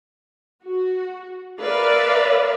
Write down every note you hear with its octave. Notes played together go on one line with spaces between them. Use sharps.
F#4
A#4 B4 D5 E5 F5